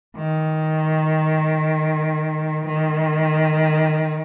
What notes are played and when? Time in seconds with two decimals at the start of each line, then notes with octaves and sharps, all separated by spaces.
0.17 D#3
2.66 D#3